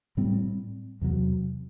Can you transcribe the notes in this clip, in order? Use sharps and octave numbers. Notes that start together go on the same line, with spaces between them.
A2 G3 C4
E2 C3 F#3